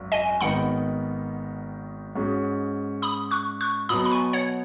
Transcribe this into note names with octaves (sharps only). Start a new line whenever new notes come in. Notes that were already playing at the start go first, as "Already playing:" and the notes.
Already playing: G#1 F#2
D#5 G#5
G#1 G#2 D#3 B3 D#4 F#5 B5
G#2 G#3 C#4 F#4
B5 D#6
C#6 F#6
C#6 F#6
B2 F#3 B3 B5 D#6
B5
G#5 C#6
C#5 F#5